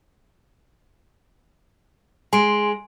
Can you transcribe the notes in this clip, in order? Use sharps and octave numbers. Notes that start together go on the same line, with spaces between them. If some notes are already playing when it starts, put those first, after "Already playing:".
G#3 G#5 C6 D7